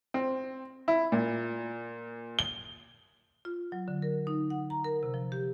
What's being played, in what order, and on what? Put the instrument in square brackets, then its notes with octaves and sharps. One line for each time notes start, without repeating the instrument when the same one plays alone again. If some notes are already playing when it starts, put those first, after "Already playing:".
[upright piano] C4
E4
A#2
G7
[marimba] F4
F#3
D3
A#4
D#4
F#5
A#5
A#4
C3
F3
G4